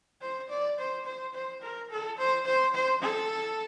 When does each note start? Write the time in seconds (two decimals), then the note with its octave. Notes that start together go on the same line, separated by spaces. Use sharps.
0.21 C5
0.50 D5
0.79 C5
1.06 C5
1.34 C5
1.62 A#4
1.91 A4
2.18 C5
2.46 C5
2.75 C5
3.02 A4